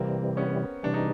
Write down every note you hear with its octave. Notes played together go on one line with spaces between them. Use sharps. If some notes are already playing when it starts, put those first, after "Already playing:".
Already playing: C3 E3 G3 A#3 C4
B3 C#4
C3 E3 G3 D4
D#4